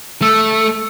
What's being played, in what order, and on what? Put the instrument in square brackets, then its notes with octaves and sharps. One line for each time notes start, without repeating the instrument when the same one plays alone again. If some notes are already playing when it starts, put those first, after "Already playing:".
[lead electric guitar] A3 [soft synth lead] E6